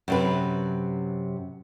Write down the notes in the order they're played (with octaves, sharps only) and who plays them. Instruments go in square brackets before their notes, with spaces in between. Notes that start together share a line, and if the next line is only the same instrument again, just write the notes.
[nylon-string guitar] F#2 C3 B4